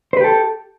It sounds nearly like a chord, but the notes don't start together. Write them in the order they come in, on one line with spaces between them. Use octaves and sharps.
C5 B4 G4 A4